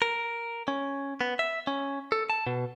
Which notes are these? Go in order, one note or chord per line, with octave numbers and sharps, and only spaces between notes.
A#4
C#4
B3
E5
C#4
A4
A5
B2